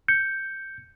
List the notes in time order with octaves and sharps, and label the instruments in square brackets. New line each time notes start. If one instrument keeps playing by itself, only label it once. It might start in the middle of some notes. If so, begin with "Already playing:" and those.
[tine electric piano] G6 C#7